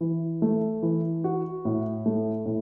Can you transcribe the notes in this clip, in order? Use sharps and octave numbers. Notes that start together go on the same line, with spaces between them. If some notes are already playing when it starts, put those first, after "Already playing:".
E3
A3
E3
F#4
A2
A3
A2